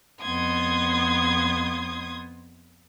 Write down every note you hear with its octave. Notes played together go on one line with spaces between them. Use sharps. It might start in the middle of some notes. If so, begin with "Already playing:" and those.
F2 B3 C6 D#6 G#6